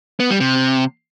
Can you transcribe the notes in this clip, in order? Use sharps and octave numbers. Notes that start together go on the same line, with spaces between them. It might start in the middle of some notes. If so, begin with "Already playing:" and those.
B3
G3
C3